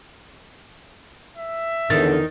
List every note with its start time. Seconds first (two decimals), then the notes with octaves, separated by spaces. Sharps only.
1.37 E5
1.90 E2 D3 D#3 A6